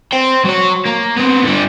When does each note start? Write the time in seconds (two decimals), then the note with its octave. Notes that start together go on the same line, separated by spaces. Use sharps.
0.12 C5 G5
0.45 F#3 C#5
0.86 A#3
1.17 B3 C4
1.43 D3 G3